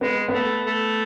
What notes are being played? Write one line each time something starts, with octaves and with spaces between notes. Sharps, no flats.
G#3 B3
B3
A3
A3